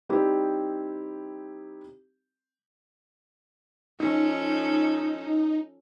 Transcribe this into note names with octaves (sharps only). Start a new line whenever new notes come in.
G3 C4 D#4 E4 G4
F3 C#4 D#4 A4